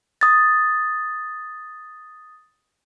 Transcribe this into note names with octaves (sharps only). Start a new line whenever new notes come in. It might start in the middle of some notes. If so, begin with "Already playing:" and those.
D#6 A6